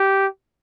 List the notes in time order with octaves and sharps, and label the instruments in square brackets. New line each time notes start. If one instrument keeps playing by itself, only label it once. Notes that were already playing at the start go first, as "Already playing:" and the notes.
Already playing: [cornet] G4